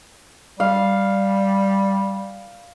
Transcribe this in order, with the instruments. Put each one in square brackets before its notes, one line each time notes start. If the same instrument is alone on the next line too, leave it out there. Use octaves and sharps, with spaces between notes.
[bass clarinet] G3 [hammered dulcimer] F5